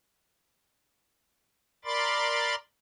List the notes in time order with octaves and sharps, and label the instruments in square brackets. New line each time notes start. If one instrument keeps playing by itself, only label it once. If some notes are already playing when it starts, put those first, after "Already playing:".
[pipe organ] A#4 D5 B5 C6 D6 A6